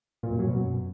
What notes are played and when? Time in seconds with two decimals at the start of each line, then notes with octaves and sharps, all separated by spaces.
0.23 A#2
0.31 F#2
0.39 F#3
0.47 B2
0.55 F#2